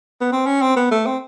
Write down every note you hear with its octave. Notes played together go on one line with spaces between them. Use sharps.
B3
C4
C#4
C4
B3
A3
C4